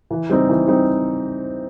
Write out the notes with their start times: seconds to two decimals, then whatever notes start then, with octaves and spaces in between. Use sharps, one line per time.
0.11 E3
0.29 G3 C4 D#4
0.49 E3
0.67 G3 C4 D#4